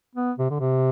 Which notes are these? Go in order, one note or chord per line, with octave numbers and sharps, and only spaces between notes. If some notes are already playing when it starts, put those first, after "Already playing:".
B3
C3
D3
C3